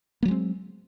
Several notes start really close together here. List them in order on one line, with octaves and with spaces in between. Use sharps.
A#3 F#3 G#3 C4